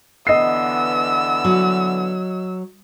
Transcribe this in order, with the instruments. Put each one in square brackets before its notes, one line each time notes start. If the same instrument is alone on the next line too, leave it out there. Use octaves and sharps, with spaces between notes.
[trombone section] D3 E3 B3 [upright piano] D#5 C7 [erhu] E6
[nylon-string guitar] F#3